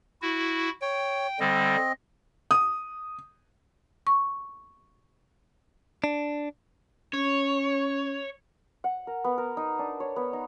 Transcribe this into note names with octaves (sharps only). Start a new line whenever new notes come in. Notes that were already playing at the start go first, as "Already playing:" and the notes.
E4 F#4
C#5 G5
D3 G3 C4 D#5
D#6
C#6
D4
C#4 C#5
F#5
A#4
B3
A#4
D#4
D4
C#5
B3
D#4